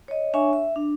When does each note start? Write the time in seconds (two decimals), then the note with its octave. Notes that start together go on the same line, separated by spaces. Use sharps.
0.08 C#5 D#5
0.34 D4 C#5 E5 G#5 C#6
0.53 E5
0.76 D4